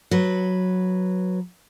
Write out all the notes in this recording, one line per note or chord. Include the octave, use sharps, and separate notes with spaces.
F#3 B4